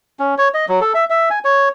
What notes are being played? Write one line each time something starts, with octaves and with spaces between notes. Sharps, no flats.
C#4
C#5
D#5
F#3
A4
E5
E5
G#5
C#5